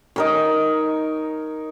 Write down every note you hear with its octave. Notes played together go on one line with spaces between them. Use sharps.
D#4 A#4 C#5